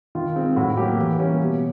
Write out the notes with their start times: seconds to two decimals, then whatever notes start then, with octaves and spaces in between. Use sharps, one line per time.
0.15 D#3 F4
0.36 G#3 C4
0.56 A2 F#4
0.77 F#3 A#3 G4
0.98 E3
1.19 G3 A#3 C#4
1.40 B2